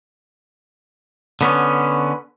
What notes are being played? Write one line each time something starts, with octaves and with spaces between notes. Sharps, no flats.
D3 B3 C#4